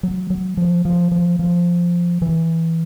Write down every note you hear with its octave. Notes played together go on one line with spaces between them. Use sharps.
F#3
F#3
F3
F3
F3
F3
E3